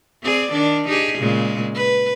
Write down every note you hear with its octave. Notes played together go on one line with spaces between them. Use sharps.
C4 G#4 D5
D#3 D4
D#4 G4 G#4
A#2 C#3 G#3
B4